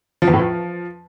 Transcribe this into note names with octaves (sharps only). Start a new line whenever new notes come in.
F3
E2
A2
F3